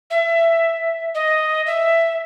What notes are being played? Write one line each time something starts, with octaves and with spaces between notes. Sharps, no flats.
E5
D#5
E5